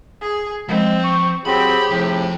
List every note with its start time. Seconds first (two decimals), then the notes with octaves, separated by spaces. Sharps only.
0.21 G#4
0.68 F3 G#3 C4
1.04 C#6
1.45 F#3 C4 G4 G#4 B5
1.90 F2 A2 C3 F3